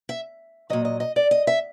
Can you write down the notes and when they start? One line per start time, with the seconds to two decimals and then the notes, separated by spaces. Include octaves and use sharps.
0.09 E5
0.70 A#2 F#3 D#5
0.85 D#5
1.00 D#5
1.16 D5
1.31 D#5
1.47 E5